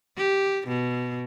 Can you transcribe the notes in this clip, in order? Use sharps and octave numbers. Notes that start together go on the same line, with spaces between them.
G4
B2